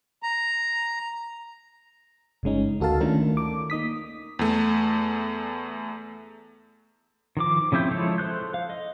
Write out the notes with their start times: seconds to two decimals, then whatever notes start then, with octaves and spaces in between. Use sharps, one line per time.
0.23 A#5
2.43 G1 C#3 G#3 C#4 D#4
2.80 D2 F#4 A4 A#4 F5 A5
3.00 D#3 A3 C#4 D4 F4 A#4
3.37 D6
3.70 A#3 D#4 D#6 B6
4.39 E2 A3
7.37 D#3 F3 D6
7.72 C#3 F3 C4 E4 G6
7.91 F3 G#3 E4 A4 C#5
8.18 A4 C5 F#6 G6
8.54 F5
8.70 D#5